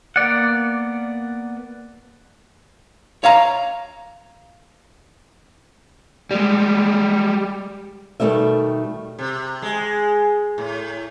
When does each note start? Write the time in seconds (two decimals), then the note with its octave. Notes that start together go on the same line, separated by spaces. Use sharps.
0.16 A#3 B3 D5 F#5
3.24 C#5 F5 A#5
6.31 G3 G#3
8.20 B2 D#3 G3 A3 E5
9.19 C3
9.62 G#3
10.58 A2